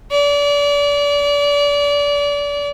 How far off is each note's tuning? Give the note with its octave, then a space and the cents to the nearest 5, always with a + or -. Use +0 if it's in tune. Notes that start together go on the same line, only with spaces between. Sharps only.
D5 -30